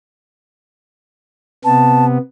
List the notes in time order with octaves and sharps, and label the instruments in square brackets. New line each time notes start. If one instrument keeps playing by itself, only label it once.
[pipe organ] C3 B3 [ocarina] A5